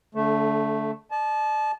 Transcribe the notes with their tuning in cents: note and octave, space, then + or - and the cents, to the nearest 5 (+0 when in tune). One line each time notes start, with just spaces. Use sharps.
D3 -30 A3 +0
D5 +45 A5 -25